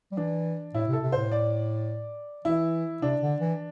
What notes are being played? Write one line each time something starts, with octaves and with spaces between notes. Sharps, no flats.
G3
E3 D4
A2 E4
C3
A4
C3
A2 C5
D5
E3 E4
C3 D4
D3
E3